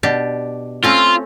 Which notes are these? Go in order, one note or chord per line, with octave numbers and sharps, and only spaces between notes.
B2 D4 G4
A3 C4 C#4 F4